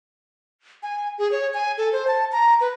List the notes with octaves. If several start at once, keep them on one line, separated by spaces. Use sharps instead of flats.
G#5
G#4
C#5
G#5
A4
C5
A5
A#5
B4